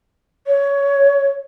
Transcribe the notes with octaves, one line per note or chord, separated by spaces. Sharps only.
C#5